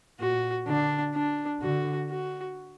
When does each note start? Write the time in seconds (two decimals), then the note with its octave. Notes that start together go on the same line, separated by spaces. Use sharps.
0.19 A#2 F#4
0.67 D3 D4
1.14 D4
1.61 D3 F#4
2.09 F#4